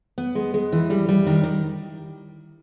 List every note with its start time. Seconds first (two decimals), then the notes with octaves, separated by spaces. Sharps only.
0.18 B3
0.35 G#3
0.54 G#3
0.72 E3
0.90 G3
1.09 G3
1.27 D#3
1.43 D#3